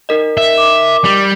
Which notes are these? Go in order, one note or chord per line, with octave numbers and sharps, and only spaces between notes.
D#4 A#4 D#5
E5
D6
G3